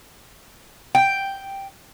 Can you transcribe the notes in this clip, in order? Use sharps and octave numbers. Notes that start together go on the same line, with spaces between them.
G5